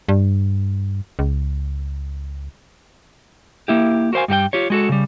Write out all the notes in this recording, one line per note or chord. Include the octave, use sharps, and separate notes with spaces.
G2
C#2
A#3 E4 G4
F#4 A#4 C5 F5 G#5
G2 G3 F#4 G5
F4 G4 C#5
G#3 F#4 A4
C#3 G3